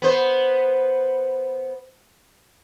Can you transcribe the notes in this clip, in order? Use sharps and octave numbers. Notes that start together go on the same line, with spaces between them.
B3 C5